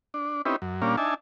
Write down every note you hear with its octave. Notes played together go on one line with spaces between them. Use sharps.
D4
C4 C#4 D#4 E4 G4 B4
F#2
A#2 G3 A#3 C#4 D4 F5
D4 D#4 E5 G#5 A5